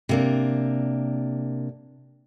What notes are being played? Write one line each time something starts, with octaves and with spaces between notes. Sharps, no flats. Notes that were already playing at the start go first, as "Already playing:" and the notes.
C3 A#3 D4